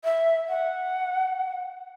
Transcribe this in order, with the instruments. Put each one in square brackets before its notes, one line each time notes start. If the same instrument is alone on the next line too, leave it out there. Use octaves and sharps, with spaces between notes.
[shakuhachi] E5
F#5